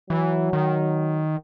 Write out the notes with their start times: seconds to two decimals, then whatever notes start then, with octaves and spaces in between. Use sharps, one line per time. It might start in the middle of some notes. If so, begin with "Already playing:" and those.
0.10 E3 F#3
0.53 D#3